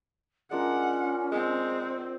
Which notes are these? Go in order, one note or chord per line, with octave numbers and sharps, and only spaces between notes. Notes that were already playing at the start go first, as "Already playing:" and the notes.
G#3 C#4 D4 F4 A#4 F#5
G#3 C4